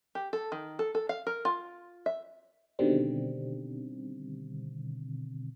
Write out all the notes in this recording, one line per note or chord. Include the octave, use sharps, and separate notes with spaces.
G4
A4
D#3
A4
A4
F5
A#4
F4
E5
B2 D3 D#3 G3 C4